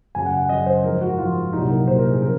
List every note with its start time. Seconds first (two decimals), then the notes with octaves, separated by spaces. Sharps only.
0.15 F#2 C#3 F#3 G#5
0.26 F#5
0.38 F#5
0.49 F#2 C#3 F#3 D#5
0.66 C5
0.84 G#2 F3 A#4
1.01 F#4
1.18 G#2 F3 F4
1.53 C2 A#2 F#3 D#4
1.70 A#4
1.87 C2 A#2 F#3 C5
1.99 A#4
2.11 G#4
2.22 C#3 F3 A#4